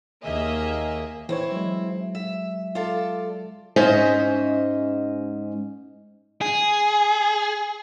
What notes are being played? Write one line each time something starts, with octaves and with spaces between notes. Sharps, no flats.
D#2 A#3 G#4 D#5 E5
E3 C4 E4 C5 C#5
F#3 G#3
E5
F4 A4 D5
G#2 G#3 C#4 C5 D#5 E5
G#4